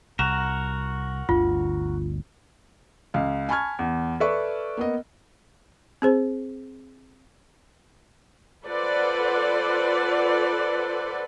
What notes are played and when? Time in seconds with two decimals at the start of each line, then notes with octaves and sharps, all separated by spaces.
0.19 C2 F#4 A#4 E7
1.29 G1 D2 D3 F4
3.14 C#2 F5
3.49 G#5 A5 B5 C#6 F6 G#6
3.79 E2
4.20 A4 B4 D5 E5 C#6
4.77 A#3 B3 D#5
6.02 C4 G#4 C5
8.65 F4 A4 B4 C5 D5 F#5